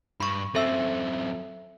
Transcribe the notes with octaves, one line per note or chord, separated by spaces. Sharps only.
G2 B5 C#6
F#2 C4 A4 E5 E6